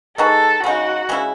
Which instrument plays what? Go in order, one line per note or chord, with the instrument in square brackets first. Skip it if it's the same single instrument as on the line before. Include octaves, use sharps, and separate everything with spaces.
[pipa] G#3 D#4 F#4 B4 [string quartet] A4
[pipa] C#3 G#3 D#4 [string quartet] F#4
[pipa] C#3 G#3 C#4 E4